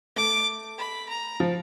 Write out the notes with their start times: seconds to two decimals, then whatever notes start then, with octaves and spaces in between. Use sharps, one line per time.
0.16 A3 D6
0.78 B5
1.09 A#5
1.40 F3